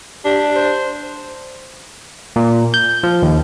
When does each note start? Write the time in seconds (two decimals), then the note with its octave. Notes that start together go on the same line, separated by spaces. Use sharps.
0.25 D4 G4
0.56 C5
2.36 A#2
2.74 G6
3.03 F3
3.22 D#2